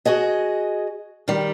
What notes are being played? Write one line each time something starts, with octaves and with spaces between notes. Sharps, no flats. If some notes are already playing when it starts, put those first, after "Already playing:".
F#4 G#4 D#5
D#3 G3